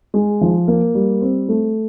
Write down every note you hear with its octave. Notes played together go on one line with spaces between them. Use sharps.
G#3
F3
A#3
G3
C4
A3